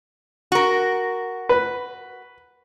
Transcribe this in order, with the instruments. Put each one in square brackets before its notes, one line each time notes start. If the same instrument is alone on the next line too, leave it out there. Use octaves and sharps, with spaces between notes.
[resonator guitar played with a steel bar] F#4 A#4
[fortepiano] B4